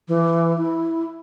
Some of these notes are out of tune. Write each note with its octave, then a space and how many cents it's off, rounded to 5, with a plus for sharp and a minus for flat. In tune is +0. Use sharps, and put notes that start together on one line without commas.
E3 +20
E4 -5